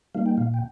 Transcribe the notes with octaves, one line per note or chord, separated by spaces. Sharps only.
G3 A#3 D#4 F5
G5
A#2 F5
G5